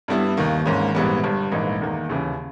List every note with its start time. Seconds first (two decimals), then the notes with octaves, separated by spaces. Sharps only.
0.08 G2 G3 B3 E4
0.37 D#2 D#3 A#3
0.65 G#1 G#2 E3 A#3 C#4
0.95 A#1 G#2 E3 G3 B3
1.24 G1 G2 G3
1.52 A#1 G#2 E3 A#3 D#4
1.81 E2 D#3 A#3
2.09 D#2 C#3 E3